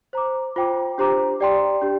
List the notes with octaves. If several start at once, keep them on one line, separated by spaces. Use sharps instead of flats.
C5 A#5 D6
F4 C5 G5 D6
D4 G4 C5 A#5 D6
G4 D5 G5 C6
D4 G4